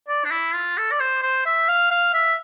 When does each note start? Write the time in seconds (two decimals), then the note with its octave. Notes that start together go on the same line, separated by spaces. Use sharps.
0.08 D5
0.25 D4
0.31 E4
0.54 F4
0.77 A4
0.92 D5
1.00 C5
1.23 C5
1.46 E5
1.68 F5
1.91 F5
2.14 E5